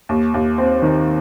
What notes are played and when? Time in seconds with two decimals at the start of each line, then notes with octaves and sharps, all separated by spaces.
0.09 D#2
0.34 D#2
0.58 C4
0.82 D#3